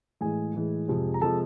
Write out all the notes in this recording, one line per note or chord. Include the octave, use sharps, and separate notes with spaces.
A2 E3 G#3 G#4 G#5
A2 E3 G#3
F2 C3 F3 G#3
A#5
C3 F3 G#3 A4 A5